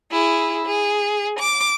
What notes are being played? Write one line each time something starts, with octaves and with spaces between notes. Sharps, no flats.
E4 G#4
G#4
D6